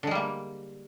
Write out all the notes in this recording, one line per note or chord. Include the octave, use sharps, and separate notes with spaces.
D3 G3 G#3 A#3